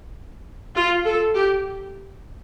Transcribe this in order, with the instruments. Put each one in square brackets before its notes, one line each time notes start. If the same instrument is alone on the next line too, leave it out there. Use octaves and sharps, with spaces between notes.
[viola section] F4
A4
G4